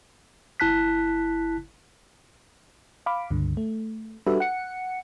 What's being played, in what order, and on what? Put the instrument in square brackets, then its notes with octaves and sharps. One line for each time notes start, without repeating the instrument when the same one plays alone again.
[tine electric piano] G1 E4 A5 F#6 B6
[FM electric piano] F5 B5 D6
C#2 G2 D3
A3
G3 D4 F#4 A4 B4 E5
F#5 C#7